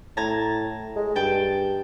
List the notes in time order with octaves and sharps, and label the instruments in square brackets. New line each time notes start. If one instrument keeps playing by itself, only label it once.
[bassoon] A2 [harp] A5 A#5 G#6
[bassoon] G#3
[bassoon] G2 [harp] G5 A5